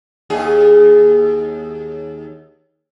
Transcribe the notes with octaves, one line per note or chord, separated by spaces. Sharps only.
D#2 G#4